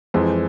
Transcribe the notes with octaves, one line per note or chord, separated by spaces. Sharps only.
F2 E3 G#3 C5